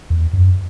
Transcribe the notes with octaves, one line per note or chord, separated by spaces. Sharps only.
E2
F#2